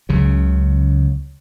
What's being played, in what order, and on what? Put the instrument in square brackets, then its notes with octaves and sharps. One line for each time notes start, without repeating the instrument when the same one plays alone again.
[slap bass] C#2 C#3 F#3